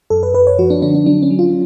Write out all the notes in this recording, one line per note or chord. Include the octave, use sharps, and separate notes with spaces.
F#2 A4
B4
F#2 B4
C#5
F3 F#4
D4
D3 D4
D4
F#3 D4
C#4
F#3
F4